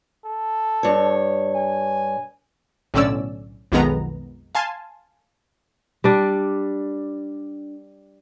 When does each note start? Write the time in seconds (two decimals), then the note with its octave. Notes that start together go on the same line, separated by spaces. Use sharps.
0.25 A4
0.83 G2 C#5
1.55 G#5
2.94 B1 A2 D3 C#4 D5 E6
3.72 B1 F2 D#3 G#3 B3 A#5
4.55 F5 G#5 A5 C6
6.04 G3 D4